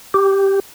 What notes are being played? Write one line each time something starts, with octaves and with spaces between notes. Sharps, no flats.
G4